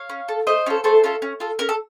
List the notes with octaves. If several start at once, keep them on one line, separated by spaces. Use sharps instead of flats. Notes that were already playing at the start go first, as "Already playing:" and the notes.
Already playing: C#5 F5
C#4
A4
A3 C5 D#5
C#4 F4 A4
A3 A4 C5
C#4 F4 A4
C#4
F4 A4
C#4 A#4
A4